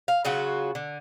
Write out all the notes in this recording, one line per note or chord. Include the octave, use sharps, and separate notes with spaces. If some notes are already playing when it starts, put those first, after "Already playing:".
F5
C#3 F#3 F4 F#4
D3